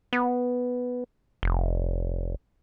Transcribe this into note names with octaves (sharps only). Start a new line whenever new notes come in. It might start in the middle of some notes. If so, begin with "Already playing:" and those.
B3
F1